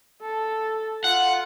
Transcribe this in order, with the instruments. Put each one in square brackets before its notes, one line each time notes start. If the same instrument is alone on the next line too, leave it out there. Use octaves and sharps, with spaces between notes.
[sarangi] A4
[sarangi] F4 [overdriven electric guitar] F#5